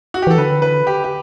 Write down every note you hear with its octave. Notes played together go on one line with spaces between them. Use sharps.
F#4
G4
E3 A4
D3 B4
B4
G4
G4